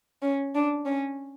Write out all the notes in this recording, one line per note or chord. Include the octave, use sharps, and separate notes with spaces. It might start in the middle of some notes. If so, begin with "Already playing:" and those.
C#4
D4
C#4